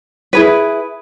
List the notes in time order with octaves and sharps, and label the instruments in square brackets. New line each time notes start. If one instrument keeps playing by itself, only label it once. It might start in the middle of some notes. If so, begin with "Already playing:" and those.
[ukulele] E4 G#4 B4